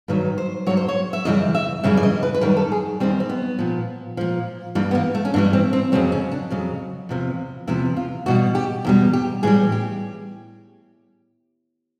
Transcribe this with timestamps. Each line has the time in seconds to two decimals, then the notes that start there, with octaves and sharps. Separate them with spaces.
0.08 G2 D#3 F#3 B4
0.38 C5
0.66 G2 D#3 F#3 C#5
0.77 C5
0.88 C#5
1.13 E5
1.25 F#2 C#3 E3 G3 D#5
1.55 E5
1.84 F#2 C#3 E3 G3
1.97 D5
2.03 D#5
2.23 B4
2.34 B4
2.41 F#2 D#3 G3 A#4
2.57 A4
2.72 G#4
3.00 F#2 D#3 G3 C4
3.20 C4
3.30 B3
3.59 A#2 F3
4.17 A#2 F3
4.75 G2 E3 G3 A#3
4.91 B3
4.95 A#3
5.15 A3
5.25 C#4
5.34 G2 E3 G3 D4
5.53 C4
5.73 C4
5.92 F2 C#3 F#3 C4
6.12 C#4
6.32 D4
6.50 F2 C#3 F#3
7.09 E2 C3 F3
7.67 E2 C3 F3 E4
7.97 F4
8.26 E2 B2 G3 F#4
8.55 G4
8.85 E2 B2 G3
9.13 G4
9.43 A2 E3 G3 G#4
9.72 G4